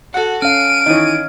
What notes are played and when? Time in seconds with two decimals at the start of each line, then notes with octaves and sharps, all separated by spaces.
0.14 F#4 A4 F#5
0.42 C#4 F5 F6 D7 D#7
0.86 D#3 E3 C#5 D#5